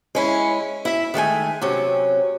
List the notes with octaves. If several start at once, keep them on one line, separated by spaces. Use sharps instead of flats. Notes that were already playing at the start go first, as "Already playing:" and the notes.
G#3 C#4 E4
E4 E5
D#3 G#3 A3 G#5
C3 F#3 C4 C#4